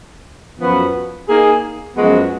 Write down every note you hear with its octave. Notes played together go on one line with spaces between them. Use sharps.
F#2 F3 B3 F#4 B4
A#3 D#4 G#4
F#2 F3 G#3 B3 F#4